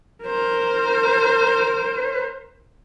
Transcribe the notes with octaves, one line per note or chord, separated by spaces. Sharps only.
A#4 C5